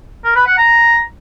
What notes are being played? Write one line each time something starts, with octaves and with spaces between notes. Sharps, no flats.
A#4
B4
F#5
A#5